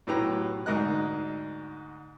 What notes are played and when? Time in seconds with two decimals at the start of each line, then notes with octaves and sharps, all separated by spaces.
0.07 B1 A2 G4 B4 A#5
0.66 D2 G#2 A#4 D#5 F#6